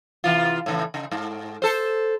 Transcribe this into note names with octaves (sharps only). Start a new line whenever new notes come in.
C3 E3 F4
A2 C#3 E3
C#3
G#2
A4 C5